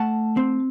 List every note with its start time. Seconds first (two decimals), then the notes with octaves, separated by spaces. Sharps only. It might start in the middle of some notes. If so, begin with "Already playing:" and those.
Already playing: A3 F#5 A5
0.37 C4